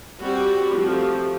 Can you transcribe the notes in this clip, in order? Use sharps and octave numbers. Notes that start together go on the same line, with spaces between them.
G3 C4 F#4
F3 A3 C4 G4